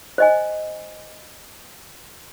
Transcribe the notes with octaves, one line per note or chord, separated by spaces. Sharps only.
C5 D#5 G#5